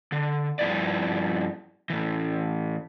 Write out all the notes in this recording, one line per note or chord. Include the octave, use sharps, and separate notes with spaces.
D3
G2 C#3 F3 E4 B4 D5
A2 E3